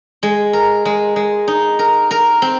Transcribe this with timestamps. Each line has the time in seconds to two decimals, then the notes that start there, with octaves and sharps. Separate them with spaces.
0.23 G#3
0.53 A#4
0.85 G#3
1.16 G#3
1.48 D#4
1.79 A#4
2.11 A#4
2.42 C4